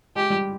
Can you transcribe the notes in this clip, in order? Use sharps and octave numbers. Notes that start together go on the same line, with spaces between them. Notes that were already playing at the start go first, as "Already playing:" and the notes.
G#3 G4
G3